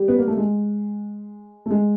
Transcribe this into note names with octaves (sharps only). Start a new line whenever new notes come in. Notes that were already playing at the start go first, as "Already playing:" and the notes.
Already playing: G3
B3
A#3
A3
G#3
A3
G#3